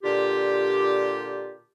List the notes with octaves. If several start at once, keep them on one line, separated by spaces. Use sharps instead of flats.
A#2 D3 F4 G4